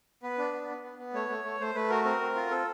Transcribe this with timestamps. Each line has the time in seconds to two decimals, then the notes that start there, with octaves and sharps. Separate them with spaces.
0.23 B3 B4
0.38 D4
0.53 B3
0.69 B3
0.83 B3
0.99 B3
1.14 A3 C#5
1.29 A3
1.44 A3
1.60 A3 C5
1.75 A3 B4
1.90 F#4 A#4
2.05 C4 A#4
2.21 C4
2.36 F4
2.51 C4 A4